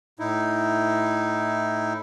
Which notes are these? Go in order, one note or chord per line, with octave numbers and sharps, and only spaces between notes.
A2 D#4 E4